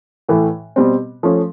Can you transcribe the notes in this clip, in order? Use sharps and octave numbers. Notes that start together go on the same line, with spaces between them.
A2 E3 A3
B2 G3 C4
F3 A3 C#4